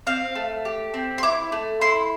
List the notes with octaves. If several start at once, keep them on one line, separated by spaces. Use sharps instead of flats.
C4 F5
A3
G4
C4
C6
E4 D6
A3
E4 C6